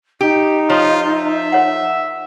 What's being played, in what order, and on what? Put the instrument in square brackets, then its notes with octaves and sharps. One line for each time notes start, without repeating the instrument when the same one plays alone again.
[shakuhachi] D#4 [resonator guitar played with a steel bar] G4
[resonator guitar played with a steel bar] F3 [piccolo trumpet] F4 [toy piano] C#5 A#5 C6
[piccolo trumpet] E5
[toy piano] A#4 C#5 F#5